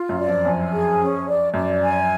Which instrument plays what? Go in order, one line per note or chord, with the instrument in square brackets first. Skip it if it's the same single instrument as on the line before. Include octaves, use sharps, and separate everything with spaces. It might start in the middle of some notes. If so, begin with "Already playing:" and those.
Already playing: [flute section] F4
[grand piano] F#2
[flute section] D5
[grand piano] F2
[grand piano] F2 [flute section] G#5
[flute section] G#4
C#4
D5
[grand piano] F#2 [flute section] D5
[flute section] G#5